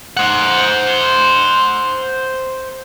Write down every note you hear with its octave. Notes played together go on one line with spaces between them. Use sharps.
C5 F#5